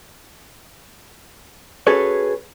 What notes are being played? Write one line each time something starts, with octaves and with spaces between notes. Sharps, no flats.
C#4 F#4 G#4 A4 B4 C#5